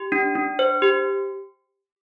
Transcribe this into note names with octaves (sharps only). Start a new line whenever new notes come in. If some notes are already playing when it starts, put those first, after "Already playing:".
Already playing: G4
D4
D4
C5
G4